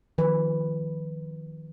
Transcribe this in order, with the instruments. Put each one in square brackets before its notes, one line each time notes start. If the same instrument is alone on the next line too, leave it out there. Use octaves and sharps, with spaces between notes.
[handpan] D#3 F3 B4